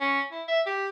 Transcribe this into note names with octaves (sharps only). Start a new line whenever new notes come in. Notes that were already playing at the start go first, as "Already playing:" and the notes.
C#4
E4
E5
G4